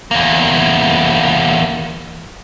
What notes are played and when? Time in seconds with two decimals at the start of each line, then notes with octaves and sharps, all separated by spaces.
0.11 E2 A#3